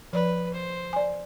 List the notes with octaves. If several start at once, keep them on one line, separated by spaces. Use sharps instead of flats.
F3 B4 D5
C5
D5 G#5